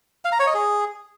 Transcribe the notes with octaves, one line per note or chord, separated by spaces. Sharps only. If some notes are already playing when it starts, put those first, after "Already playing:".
F5
A#5
C#5
D#5
G#4